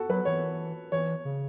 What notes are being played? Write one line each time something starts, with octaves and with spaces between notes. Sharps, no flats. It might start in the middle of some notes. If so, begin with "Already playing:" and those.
Already playing: F#4 A4
F#3 B4
E3 C#5
E3 C#5
C#3